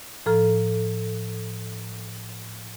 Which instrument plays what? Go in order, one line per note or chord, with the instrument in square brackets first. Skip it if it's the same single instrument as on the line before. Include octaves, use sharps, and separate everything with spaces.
[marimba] A2 F3 A4 A#5 F6